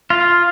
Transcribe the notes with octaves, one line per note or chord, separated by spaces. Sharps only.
F4